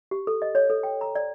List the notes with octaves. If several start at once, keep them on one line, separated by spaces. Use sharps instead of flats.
G4
A4
D#5
C#5
A4
G5
A#5
D5